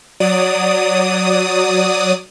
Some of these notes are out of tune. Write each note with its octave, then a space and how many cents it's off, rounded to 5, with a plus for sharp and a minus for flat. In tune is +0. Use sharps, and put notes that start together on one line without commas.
F#3 +0 D5 +0 D#6 +0